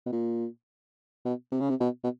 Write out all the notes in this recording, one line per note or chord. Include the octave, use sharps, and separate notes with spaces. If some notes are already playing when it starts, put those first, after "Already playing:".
B2
A#2
B2
C3
C#3
C3
B2
B2